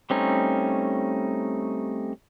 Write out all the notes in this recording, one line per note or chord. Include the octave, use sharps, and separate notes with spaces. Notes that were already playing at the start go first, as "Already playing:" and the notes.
G3 A3 C4 C#4 D#4